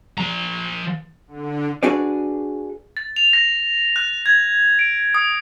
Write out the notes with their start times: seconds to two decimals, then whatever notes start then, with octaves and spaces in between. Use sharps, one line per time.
0.18 F3 A#5
1.27 D3
1.83 D4 F#4 G#4 B4 D5
2.97 A6
3.16 F7
3.33 A#6
3.96 F#6
4.26 G#6
4.79 D7
5.14 D#6